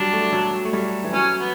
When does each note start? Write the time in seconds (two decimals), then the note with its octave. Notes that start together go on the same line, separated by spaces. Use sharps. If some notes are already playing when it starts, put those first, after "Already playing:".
Already playing: F#3 G3 D4
0.13 A3
0.33 F#3
0.65 A3
0.73 G3
1.04 E3
1.13 F#3 C#4
1.39 B3